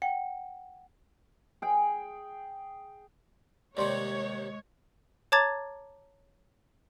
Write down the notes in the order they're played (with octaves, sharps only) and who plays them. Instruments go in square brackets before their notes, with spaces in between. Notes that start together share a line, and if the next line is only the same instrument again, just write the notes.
[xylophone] F#5 [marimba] G5
[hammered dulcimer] G#4 G5
[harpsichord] D#2 C3 G3 [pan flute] G#3 [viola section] C#5 [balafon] D5 C6
[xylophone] C#5 A5 A#5 D6 G#6 A6